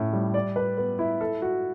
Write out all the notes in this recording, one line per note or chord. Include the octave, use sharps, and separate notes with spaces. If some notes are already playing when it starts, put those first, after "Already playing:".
Already playing: A2 C#4
G3
D5
B4
B3
E4
A4
F#4